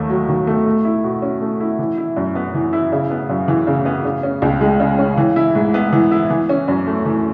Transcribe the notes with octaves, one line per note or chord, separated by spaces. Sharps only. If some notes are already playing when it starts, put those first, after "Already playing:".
Already playing: D#2 D#3 A3
F#3
D#3
A3
A3
E4
B2
C#4
A3
E4
E3
E4
F#2
B3
E3
E4
C#3
B3
F#2
E3
C#3
B3
C#3
C#4
C#2
G#3
C#3
C#4
E3
E4
G#2
B3
E3
E4
E3
C#4
F#2
A3
E3